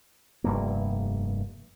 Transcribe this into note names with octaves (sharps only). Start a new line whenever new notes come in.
F1 G2 A#3